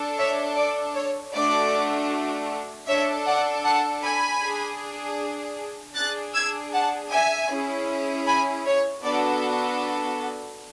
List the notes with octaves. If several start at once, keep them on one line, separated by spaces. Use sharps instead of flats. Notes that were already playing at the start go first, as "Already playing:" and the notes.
Already playing: D4 A4
C#5 E5
D5
C#5
A3 D4 F#4 A4 D5
D4 A4 C#5 E5
D5 F#5
F#5 A5
G#5 B5
D4 G#4
D4 G#4 F#6 A6
E6 G#6
F#5 A5
E5 G#5
C#4 E4 G#4
G#5 B5
C#5
B3 D4 F#4 A4 D5